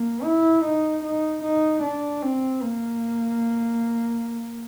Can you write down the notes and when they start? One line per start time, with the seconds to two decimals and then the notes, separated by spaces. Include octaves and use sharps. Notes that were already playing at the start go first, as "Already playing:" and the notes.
Already playing: A#3
0.24 E4
0.64 D#4
1.04 D#4
1.43 D#4
1.83 D4
2.23 C4
2.62 A#3